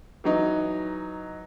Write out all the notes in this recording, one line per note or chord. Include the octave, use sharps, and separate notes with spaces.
E3 F#3 D#4